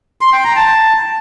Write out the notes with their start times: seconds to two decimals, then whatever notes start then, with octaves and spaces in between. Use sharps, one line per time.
0.21 C6
0.33 G5
0.44 A#5
0.56 A5